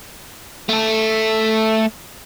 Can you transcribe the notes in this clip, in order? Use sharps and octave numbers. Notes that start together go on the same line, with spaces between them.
A3 A4